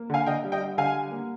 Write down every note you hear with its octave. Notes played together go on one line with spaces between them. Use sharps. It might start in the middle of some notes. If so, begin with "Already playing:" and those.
Already playing: A#3
D3 F5 G#5
D3 D#5 G5
G3
D#5 G5
G3
D3 F5 G#5
G3
A#3